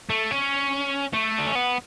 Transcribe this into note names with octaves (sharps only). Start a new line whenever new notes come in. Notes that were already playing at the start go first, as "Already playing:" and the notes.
A3
C#4
A3
D4
C#4
B3